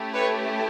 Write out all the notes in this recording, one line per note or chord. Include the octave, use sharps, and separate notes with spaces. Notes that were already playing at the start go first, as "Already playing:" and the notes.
Already playing: A3 C#4 E4 G4
B4 C#5